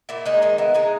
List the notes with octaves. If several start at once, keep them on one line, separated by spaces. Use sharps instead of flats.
A#2 E4
G#3 D#4
D#3 D#4
B3 E4
G#3 D#4